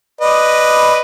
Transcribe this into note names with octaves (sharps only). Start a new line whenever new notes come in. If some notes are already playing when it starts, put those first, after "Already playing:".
B4 D5 D#5